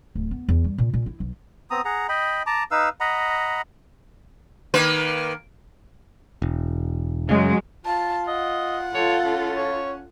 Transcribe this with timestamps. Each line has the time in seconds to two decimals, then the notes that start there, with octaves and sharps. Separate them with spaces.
0.15 D1
0.31 B3
0.49 E2
0.64 G2
0.78 A#2
0.93 A#2
1.06 E4
1.20 B1
1.70 B3 C4 A#5 D#6
1.85 G#4 F#5 A#5
2.09 D#5 G5 B5
2.46 A5 A#5 D6
2.71 D#4 B4 F5 E6
3.01 D#5 F#5 A#5 B5
4.74 D#3 A#3 B4
6.42 E1
7.29 F#2 C#3 F#3 G#3
7.86 F4 A5
8.28 D#5 F#5
8.94 F4 A4 C#5
9.25 C#4
9.56 C#5